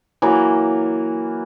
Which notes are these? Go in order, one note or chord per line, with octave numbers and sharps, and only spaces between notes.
E3 F#3 A#3